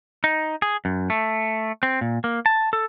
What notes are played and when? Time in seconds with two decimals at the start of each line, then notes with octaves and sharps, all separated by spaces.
0.24 D#4
0.62 G#4
0.85 F#2
1.10 A3
1.83 C4
2.01 A#2
2.24 A#3
2.46 A5
2.73 A4